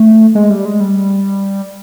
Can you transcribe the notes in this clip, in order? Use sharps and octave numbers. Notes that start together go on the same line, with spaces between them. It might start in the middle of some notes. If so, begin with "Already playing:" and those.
Already playing: A3
G#3
G3
G#3
G3